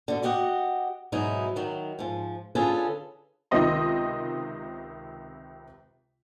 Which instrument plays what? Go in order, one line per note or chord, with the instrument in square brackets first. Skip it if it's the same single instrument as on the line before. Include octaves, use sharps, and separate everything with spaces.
[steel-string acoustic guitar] B2 D3
E4 F#4 G4 D#5 F#5
G#2 B2 F#3 B3 D#4 E4
D#3 F#3
G#2 F3
D3 C#4 F4 G#4 A4 B4
[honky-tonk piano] C#2 C3 D#3 C4 D#5 C6